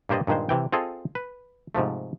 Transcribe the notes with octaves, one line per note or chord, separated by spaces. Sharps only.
G2 A#3 G4 C5 D5 D#5
G2 A#2 D#3 G#3 C5
C3 E3 G5
C4 F4 G#4 A4 D#5
B4
G#2 C3 F3 A3